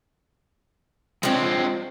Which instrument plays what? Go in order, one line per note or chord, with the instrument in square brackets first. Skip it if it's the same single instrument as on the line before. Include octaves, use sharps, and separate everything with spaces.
[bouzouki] F3 C4 [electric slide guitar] G#3 D4 C#5